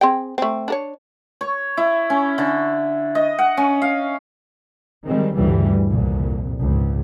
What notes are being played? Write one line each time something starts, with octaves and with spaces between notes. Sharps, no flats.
C4 G#4 G5
A3 C4
D4 A#4 C#5
C#5
E4
C#4
D3
D#5
F#5
C#4
F5
D#3 G3 G#3 C4
D2 G2 A#2 C#3 E3 G3
C2 F2 A#2
C#2 G#2